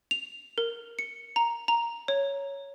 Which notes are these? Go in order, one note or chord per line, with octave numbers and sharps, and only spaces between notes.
F7
A#4
C#7
A#5
A#5
C#5